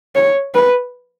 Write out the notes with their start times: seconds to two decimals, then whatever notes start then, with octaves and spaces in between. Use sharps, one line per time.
0.15 C#5
0.54 B4